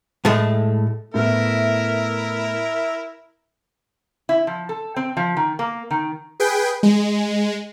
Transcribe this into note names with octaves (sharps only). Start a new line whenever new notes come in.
A2 G#3 A3
A2 A3 B3 E4 A#4 E5
E4
F3
A4
C4
F3
D#3
A#3
D#3
G#4 B4 G5
G#3